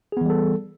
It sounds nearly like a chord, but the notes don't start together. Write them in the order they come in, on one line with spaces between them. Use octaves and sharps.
G#4 B3 E3 G3 A4